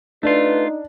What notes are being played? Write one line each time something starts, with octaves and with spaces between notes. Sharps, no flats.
A3 D4 D#4 F4 B4